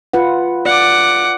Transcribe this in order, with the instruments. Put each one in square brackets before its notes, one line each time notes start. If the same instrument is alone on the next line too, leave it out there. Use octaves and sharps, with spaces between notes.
[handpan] F4 B4 F#5
[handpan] D5 [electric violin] F#5 D6